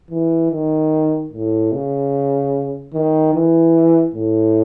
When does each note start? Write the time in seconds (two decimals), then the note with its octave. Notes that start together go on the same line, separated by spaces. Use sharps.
0.11 E3
0.51 D#3
1.33 A2
1.72 C#3
2.93 D#3
3.34 E3
4.14 A2